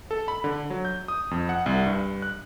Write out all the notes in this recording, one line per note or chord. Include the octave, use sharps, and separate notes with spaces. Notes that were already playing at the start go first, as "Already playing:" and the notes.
A4
B5
D3
F#3
G6
D#6
F2
F#5
C2
G2
F#6